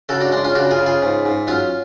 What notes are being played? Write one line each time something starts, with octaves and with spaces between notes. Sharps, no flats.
C#3 F#4 A4
D4 F#4
G#3 D4
C#4 F4
C#3 D4 F#4
F4 G#4
C#3
F4 G#4
G#2
G#2
F#3 C#4 F4